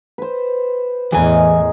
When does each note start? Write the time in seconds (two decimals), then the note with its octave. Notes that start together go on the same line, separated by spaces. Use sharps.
0.18 B4 C5
1.12 E2 A2 E3 G#4 A#4 D#5 G#5